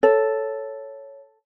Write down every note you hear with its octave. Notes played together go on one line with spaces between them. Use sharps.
A4 C#5